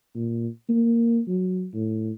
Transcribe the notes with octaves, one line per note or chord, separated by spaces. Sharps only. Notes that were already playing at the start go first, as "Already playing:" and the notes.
A#2
A#3
F#3
A2